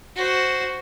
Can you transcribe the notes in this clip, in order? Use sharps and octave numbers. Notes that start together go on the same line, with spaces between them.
F#4 C5